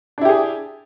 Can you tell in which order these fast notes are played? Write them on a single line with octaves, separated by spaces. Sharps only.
D4 E4 G4 G#4